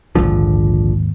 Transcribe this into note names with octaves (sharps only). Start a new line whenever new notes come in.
A#1 D#2 G#2 D3 F3